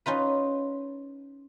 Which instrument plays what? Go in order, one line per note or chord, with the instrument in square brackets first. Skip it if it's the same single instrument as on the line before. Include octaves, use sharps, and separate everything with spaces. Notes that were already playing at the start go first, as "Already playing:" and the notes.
[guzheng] C#4 D#4 F4 B4